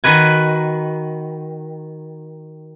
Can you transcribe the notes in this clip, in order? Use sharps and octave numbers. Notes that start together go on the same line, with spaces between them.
D#3 F#4 B4 G#5